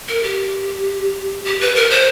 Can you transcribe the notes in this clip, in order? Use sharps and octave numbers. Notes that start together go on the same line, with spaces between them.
A#4
G4
G4
B4
A#4
C5